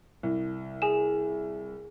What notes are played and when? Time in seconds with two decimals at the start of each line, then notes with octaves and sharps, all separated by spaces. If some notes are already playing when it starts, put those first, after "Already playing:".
0.23 C2
0.82 G#4 G#5 E7